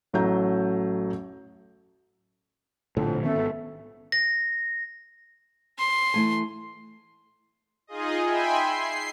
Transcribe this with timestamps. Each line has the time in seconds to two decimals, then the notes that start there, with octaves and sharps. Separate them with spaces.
0.13 A1 F#3 A3 A#5 G6
2.97 A#1 F2 A2 D3
3.23 D#3 A3 B3 C#4
3.36 G#1 B3
4.12 A#6
5.79 C6
6.14 E3 A3 G#5
7.87 D#4 F4 G#4 D#5
8.24 E5 G5 G#5 B5 C6
8.61 C7